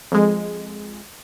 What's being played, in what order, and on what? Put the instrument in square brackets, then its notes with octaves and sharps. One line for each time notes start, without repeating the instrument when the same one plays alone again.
[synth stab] F2 G#3